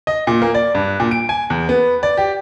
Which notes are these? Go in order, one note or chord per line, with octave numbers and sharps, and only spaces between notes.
D#5
A#2
A#3
D5
G2
A#2
D7
G#5
E2
B3
D5
G4